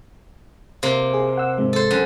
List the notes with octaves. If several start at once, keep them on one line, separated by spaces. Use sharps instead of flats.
C3 A#3
G#4
F#5 E6
G#2 C3 G#3
A4 C5
F#2